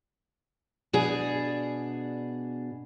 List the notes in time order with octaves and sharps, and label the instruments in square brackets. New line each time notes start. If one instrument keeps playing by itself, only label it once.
[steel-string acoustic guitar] B2 D4 G#4